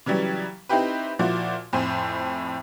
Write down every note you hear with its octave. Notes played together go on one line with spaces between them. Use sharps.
C#3 E3 F#3 G3
C4 D#4 E4 G4 B4
A#2 F3 E4 F#4
F2 A2 C5 G#5